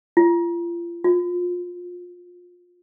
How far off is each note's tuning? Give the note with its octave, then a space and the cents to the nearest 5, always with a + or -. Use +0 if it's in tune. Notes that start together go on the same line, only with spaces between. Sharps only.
F4 -35
F4 +25